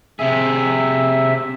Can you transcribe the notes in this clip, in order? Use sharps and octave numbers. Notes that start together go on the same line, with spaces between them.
C3 G#4 E5